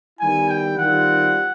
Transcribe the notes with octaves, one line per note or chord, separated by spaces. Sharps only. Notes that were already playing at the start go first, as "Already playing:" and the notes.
D#3 G3 B3 E4 G#5
G5
D#3 G3 C4 F4 F#5